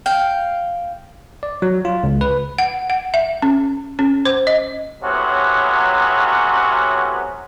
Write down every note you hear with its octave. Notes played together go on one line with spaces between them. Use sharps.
F5 G5
D5
F#3
F4
C#2
B4
F#5
F#5
E5
C#4
C#4
C5
D#5
A2 C3 F#3 B3 C#4 F#4